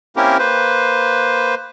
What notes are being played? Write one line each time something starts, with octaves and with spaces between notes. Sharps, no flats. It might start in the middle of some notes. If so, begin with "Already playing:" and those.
A#3 C4 C#4 E4 G4 A#4
A#3 B4 C5